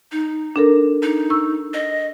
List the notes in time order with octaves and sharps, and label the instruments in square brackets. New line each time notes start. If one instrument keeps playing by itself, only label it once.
[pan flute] D#4
[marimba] D4 A4 A#4
[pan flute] D#4
[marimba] C#6 E6
[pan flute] D#5